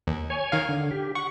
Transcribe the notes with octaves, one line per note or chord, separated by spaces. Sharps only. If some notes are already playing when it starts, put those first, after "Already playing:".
D#2
C#5 G#5
D#3 F5
D3
G4
F#5 C#6